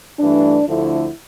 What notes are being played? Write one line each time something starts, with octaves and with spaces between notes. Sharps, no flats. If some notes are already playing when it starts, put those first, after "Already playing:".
G2 E3 A3 D4
D2 D3 F3 A3 E4